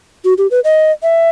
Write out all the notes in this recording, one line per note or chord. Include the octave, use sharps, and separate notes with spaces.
F#4
G4
B4
D#5
E5